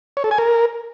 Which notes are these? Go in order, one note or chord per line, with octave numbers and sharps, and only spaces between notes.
C#5
A4
G#5
A#4